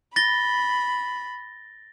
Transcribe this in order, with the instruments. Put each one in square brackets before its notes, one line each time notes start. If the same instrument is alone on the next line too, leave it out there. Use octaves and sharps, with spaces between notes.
[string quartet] B5 [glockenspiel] A6 A#6 G7